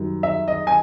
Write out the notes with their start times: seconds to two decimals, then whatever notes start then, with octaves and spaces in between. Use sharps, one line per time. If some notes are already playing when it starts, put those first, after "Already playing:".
Already playing: F#2 D#3 G3
0.23 E5
0.48 D#5
0.67 G#5